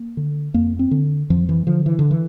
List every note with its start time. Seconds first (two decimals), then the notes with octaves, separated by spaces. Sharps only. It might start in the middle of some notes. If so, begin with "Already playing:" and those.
Already playing: A#3
0.17 D3
0.54 F2 A#3
0.79 C4
0.91 D3
1.30 F2 F3
1.49 E3
1.67 D3 F3
1.86 E3
1.99 D3
2.11 E3